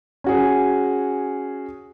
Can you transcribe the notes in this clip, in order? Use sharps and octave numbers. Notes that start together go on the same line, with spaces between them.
C#4 F#4 G#4